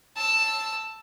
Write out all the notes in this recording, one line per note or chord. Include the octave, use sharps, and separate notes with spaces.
A5 E6